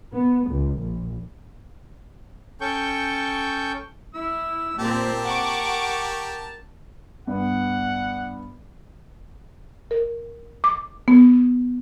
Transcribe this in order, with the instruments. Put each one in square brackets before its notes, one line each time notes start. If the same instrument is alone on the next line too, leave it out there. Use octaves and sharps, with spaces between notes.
[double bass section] B3
C#2
A#1
[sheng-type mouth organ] C#4 A4 G5 C#6 G6
[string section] E4 [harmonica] E6
[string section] A#2 C4 [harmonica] G4 A#4 A5
[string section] F#5 C#6 D6
[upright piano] G2 B3 [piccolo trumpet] F#5
[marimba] A#4
D6
B3